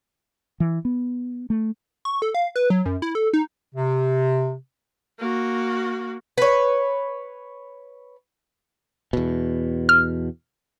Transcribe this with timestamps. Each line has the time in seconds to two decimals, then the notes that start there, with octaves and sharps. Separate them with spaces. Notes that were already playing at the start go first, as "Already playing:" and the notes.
0.60 E3
0.85 B3
1.50 A3
2.05 C#6
2.22 A4
2.34 F5
2.56 B4
2.70 F#3
2.86 F#2
3.02 E4
3.15 A4
3.33 D#4
3.75 C3
5.19 A#3 F#4
6.38 B4 C#5
9.13 E2 B2
9.89 F6